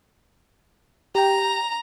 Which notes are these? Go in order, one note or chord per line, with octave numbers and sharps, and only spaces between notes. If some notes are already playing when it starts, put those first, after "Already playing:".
G4 G5 A#5